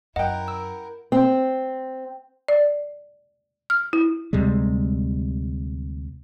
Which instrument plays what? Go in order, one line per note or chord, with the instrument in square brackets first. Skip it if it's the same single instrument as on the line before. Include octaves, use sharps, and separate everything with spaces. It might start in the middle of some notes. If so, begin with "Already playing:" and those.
[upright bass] F#2 [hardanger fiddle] E4 A#4 [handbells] D#5 [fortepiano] F#5 G5
[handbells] E6
[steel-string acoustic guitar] C4
[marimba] D5
F6
E4
[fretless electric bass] D2 C3 G3 G#3